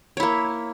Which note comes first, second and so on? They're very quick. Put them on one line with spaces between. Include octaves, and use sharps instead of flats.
C#5 E4 A#3